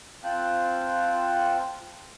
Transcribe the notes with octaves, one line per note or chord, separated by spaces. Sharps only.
C4 F4 G5 A5 F#6